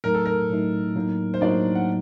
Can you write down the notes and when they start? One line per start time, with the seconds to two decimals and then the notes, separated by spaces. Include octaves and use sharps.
0.04 A2 F#3 A3 D#4 A#4
0.15 A4
0.26 A#4
0.51 A2 F#3 A3 D#4
0.96 A2 F#3 A#3 D#4
1.34 C5
1.41 A2 F#3 A#3 D4 D#4 D5
1.75 F#5